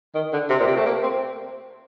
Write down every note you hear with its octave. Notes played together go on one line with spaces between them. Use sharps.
D#3
D3
C3
A#2
C3
A3
A#3
C4